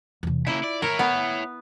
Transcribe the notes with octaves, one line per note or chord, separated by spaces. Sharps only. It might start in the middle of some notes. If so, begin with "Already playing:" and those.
E2 C3
C#3 A#3 E4 F4
D5
D#3 E4 A#4 C#5
B3